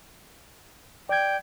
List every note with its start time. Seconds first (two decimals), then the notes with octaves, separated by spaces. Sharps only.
1.09 D5 G5 G#6